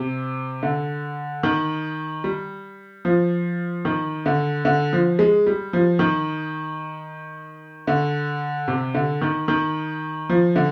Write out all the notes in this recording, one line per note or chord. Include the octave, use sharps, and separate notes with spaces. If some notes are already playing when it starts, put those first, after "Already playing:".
Already playing: C3
D3
D#3
G3
F3
D#3
D3
D3
F3
G#3
G3
F3
D#3
D3
C3
D3
D#3
D#3
F3
D3